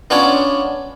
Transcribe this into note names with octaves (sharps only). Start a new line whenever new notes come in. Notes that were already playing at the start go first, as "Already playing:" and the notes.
B3 C#4 D4 F4 C#5 D5